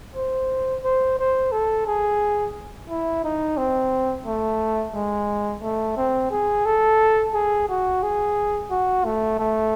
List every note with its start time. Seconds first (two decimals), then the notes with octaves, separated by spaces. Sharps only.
0.16 C5
0.84 C5
1.19 C5
1.52 A4
1.87 G#4
2.89 E4
3.24 D#4
3.57 C4
4.26 A3
4.95 G#3
5.63 A3
5.97 C4
6.31 G#4
6.65 A4
7.34 G#4
7.69 F#4
8.03 G#4
8.71 F#4
9.05 A3
9.39 A3